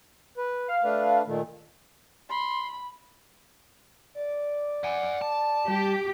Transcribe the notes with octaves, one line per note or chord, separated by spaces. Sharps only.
B4
F5
A3 D4 B4
A#2 D#3 A3
B5 C6
D5
F#5 G#5
A5
G3 G4